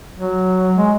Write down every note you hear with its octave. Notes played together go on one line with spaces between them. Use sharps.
F#3
G#3